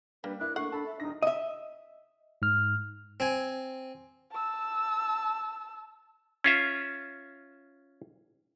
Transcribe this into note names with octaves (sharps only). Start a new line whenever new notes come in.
G3 A#3 D4 B4
D4 E4 A#4 F#6
A3 A#3 D4 F#5 C#6 C7
D4 A4 A5 B5
E5
E1 D4 D#4 A#6
D#5 E5
G#2 F6
C4 G#5
A5 E6
C#4 F4 E5